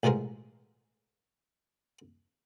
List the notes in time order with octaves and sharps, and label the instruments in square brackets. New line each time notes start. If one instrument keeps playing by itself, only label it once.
[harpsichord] A1 B2 F3 G#3 A#4